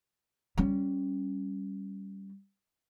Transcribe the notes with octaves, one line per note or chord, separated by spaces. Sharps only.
G3 C#4